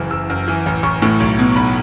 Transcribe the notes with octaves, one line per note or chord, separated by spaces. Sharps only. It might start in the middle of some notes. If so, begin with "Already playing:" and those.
Already playing: F#1 F#2 E3
F#1 E6
F#2
E3
A1
A1 C#6
A2
B1
B2
B1 B5